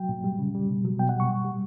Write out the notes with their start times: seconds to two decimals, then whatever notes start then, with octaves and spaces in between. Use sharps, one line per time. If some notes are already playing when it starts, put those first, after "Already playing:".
Already playing: F#3 G5
0.09 A#2
0.24 G3
0.39 C#3
0.55 G3
0.69 B2
0.85 F#3
0.99 B2 G5
1.09 F#5
1.14 G3
1.20 C#6
1.30 A#2
1.45 G3